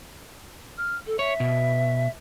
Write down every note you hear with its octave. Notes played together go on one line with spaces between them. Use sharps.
F6
A4
C#5 E5
B2